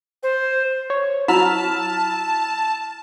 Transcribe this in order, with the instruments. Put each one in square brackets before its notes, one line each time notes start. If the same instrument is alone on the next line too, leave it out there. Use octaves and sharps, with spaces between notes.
[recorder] C5
[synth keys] C#5
[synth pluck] F#3 [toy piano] E4 [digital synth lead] A5 [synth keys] B5 E6 F6